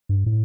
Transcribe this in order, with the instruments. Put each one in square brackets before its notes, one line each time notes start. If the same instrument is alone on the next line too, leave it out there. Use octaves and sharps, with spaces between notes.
[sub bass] G2
A2